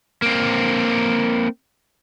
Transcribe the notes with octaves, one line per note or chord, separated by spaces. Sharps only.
A#3 C4